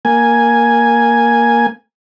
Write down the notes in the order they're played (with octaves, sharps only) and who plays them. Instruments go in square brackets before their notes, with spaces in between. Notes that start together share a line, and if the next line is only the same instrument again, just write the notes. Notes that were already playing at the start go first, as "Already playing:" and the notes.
[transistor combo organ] A#3 G#5